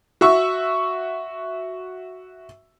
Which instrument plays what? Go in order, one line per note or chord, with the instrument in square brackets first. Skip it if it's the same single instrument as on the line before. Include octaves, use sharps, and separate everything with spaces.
[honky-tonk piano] F#4 E5 C#6 E6